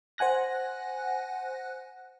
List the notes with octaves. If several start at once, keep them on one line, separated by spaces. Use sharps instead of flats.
C5 F#5 G#5 F#6 A#6